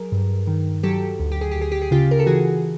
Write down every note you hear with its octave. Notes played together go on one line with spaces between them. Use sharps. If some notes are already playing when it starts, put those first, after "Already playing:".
Already playing: F#3 G#4 A#4
G2
D#3
F#3 G4 A4
D2
G4
G#4
D2 G4
G#4
G4
G#4
C#3 F4 G4
A#4
A4
E3 F#4 G#4